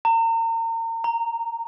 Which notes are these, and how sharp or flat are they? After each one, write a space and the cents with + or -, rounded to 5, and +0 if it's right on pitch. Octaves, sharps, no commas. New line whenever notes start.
A#5 -35
A#5 -10